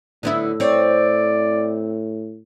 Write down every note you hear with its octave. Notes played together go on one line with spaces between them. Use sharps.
A2 D3 B3 E4
C4 C#5 D5